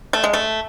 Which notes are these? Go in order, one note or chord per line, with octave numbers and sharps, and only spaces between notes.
A3
G#3
A3